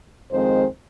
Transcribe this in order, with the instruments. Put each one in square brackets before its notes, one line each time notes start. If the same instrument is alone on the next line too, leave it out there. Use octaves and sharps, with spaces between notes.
[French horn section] F2 D#3 G#3 C4 C5